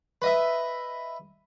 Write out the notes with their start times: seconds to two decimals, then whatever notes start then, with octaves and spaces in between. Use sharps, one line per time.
0.22 B4 D#5 E5